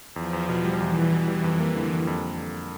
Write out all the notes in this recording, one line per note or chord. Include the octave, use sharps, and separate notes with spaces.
E2 F3
E2
B2
G3
E2 E3
E2
B2
G3
F2
A#3
D3
G3
F2